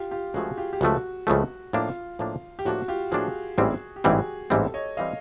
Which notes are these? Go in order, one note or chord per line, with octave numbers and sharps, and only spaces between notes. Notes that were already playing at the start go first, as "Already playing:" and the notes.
Already playing: F4 G4
F4 G4
C#2 C#3 F3 A3 F#4 G#4
F4 G4
G4
C#2 C#3 F3 A3 F#4
C#2 C#3 F3 A3
A2 F3 A#3 D4 F4
A2 F3 A#3 D4
G4
A2 F3 A#3 D4 F#4
F4 G4
A2 F3 A#3 D4 F#4 G#4
A1 G#2 E3 G3 C4
G4
A1 G#2 E3 G3 C4 F#4 G#4
A1 G#2 E3 G3 C4 G4 A4
C#5 D#5
E3 G3 C4 D#5 F5